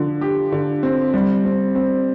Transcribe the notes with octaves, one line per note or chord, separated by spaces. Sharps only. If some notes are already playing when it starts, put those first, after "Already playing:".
Already playing: D3 F3
G4
D3
C4
G3
C4
C4